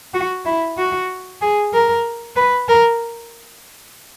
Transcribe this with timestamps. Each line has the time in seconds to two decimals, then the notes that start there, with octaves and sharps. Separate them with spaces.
0.14 F#4
0.45 E4
0.77 F#4
1.42 G#4
1.73 A#4
2.36 B4
2.68 A#4